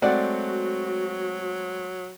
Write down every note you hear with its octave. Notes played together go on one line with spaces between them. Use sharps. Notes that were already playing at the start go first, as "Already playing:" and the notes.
F#3 G#3 A3 C4 F#4 D5 F#5